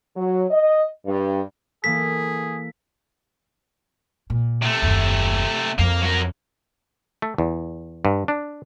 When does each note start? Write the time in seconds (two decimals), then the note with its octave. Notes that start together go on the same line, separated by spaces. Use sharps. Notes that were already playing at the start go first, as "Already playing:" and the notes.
0.14 F#3
0.50 D#5
1.05 G2
1.84 E3 A#3 G#4 A4 B6
4.30 A#2
4.62 C3 A3
4.82 F#1 D#2
5.79 F2 A#3 F5
6.02 F#3 A#4
7.22 A3
7.38 E2
8.05 G2
8.28 D4